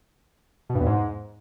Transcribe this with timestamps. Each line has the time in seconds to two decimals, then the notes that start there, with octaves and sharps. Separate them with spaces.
0.69 B2
0.75 G2
0.81 E2
0.86 G#2